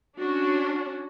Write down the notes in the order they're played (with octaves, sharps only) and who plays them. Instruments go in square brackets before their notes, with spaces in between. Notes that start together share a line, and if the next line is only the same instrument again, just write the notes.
[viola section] C#4 D4 F#4